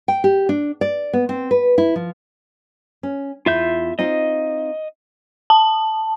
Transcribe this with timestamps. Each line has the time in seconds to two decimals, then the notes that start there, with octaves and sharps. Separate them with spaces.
0.08 G5
0.24 G4
0.49 D4
0.81 D5
1.13 B3
1.29 C4
1.51 B4
1.78 E4
1.96 F3
3.03 C#4
3.46 E2 E4 F4 E5 G6
3.99 C4 D#4 F4 D#5
5.50 A5